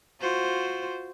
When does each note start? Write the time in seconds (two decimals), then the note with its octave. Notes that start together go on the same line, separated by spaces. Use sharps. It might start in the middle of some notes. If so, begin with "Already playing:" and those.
0.20 F4 F#4 C5